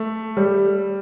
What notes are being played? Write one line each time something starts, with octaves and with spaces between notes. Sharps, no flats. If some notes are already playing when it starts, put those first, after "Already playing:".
Already playing: A3
G3